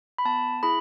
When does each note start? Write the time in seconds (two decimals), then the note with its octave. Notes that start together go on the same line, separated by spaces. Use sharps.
0.18 B5
0.25 B3 A5
0.63 E4 G#4 B5